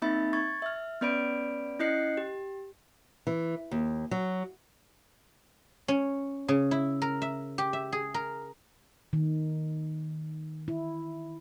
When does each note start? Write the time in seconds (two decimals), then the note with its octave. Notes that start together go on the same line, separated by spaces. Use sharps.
0.02 A#3 C4 D#4 E5 B5 A6
0.33 C#6 G#6 A6
0.62 E5 F6
1.01 B3 C#4 B4 D5 B5 D7
1.79 C#4 E4 D#5 F#6 C7 C#7
2.17 G4
3.27 E3
3.71 D#2
4.11 F#3
5.88 C#4
6.48 C#3
6.71 E4
7.02 A#4
7.22 E5
7.58 G4
7.73 E5
7.92 G#4
8.14 A#4
9.13 D#3
10.68 E4